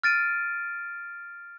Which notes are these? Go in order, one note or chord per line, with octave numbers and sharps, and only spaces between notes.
F6 A6 D7 D#7